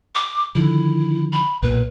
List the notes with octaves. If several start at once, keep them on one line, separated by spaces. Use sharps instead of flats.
D6
D3 D#3 F3 E4
B5
B1 A#2 B4